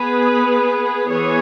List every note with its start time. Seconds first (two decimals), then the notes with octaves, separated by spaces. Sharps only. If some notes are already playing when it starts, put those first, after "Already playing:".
Already playing: B3 G#4 B4
1.10 E3 B3 G#4 C#5